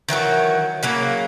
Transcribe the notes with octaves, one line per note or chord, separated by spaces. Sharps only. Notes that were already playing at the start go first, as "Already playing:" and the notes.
D#3 E3 F#3 F#4
C#3 F#3 A#3